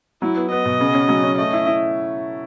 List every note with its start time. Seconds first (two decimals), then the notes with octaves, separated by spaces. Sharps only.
0.22 F#3 E4
0.36 B3
0.51 B3 D#5
0.65 B2
0.80 C#3
0.95 C#4
1.09 F#3
1.23 C#4
1.38 A3 D#5
1.53 E4
1.67 E4